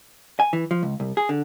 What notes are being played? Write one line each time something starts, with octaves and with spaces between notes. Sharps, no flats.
G#5
E3
F3
C#2
C2
G#4
D3